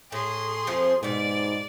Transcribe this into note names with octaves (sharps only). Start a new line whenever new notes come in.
A2 G#4 C6
F2 F3 A3
G#2 B2 G3 D5